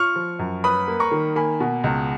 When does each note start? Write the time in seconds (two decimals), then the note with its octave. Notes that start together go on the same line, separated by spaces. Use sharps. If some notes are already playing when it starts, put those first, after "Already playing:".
Already playing: F4 C#6 F6
0.16 F3
0.39 F#2
0.64 B4 B5 D#6
0.88 A#3
1.00 A#5 C#6
1.11 D#3
1.36 A#3 G#5 B5
1.60 B2
1.84 C#2